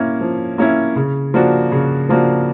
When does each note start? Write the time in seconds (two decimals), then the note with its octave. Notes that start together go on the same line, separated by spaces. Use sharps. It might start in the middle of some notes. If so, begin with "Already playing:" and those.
Already playing: A#3 C#4 E4
0.21 F3
0.58 A#3 C#4 E4
0.96 C#3
1.34 F3 A#3 D4 F#4
1.72 C#3
2.09 F3 A#3 D4 F#4